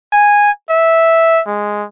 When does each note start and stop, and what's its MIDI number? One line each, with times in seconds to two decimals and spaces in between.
0.13 0.51 80
0.70 1.41 76
1.47 1.85 56